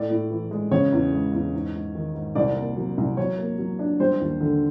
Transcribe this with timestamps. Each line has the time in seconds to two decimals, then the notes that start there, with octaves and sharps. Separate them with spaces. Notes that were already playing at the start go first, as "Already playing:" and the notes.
Already playing: A2 D5
0.10 A2
0.30 E3
0.51 G#3
0.71 C#3 C#5
0.92 E2
1.13 G#3
1.33 E2
1.54 G#2
1.74 G#2
1.95 D#3
2.15 G#2
2.35 C2 D5
2.56 A#3
2.77 F#3
2.97 C2
3.17 F#3 C#5
3.38 A#3
3.58 F#3
3.79 D4
4.00 G3 C5
4.20 D#2
4.41 D3